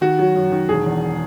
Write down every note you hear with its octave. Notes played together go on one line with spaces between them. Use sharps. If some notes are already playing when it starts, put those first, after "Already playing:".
D#3 F#4
F#3
F#2
D#3
E1 G#4
E2